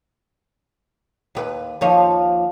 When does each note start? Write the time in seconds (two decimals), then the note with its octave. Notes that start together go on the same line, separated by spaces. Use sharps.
1.35 D#2 G4 B4
1.81 D#2 F3 C#5